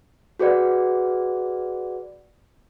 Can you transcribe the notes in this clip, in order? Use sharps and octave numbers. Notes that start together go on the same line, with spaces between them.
F#4 G#4 B4 D5 F#5